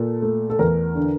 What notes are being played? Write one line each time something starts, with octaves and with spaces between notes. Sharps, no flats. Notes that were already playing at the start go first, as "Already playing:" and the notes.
Already playing: A#2 A4
A3
A4
E2 A#4
D3